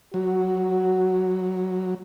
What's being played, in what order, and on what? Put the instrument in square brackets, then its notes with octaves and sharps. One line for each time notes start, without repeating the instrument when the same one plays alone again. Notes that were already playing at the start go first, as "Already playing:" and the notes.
[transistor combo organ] F#3 [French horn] F#4